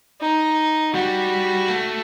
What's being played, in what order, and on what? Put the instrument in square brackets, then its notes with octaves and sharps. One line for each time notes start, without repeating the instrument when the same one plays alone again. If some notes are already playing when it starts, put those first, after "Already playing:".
[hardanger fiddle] D#4
[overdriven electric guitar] G3 [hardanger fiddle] F#4
[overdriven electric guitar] A3